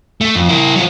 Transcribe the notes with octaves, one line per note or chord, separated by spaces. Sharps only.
A3
F2
E4 A#4
F#3 F4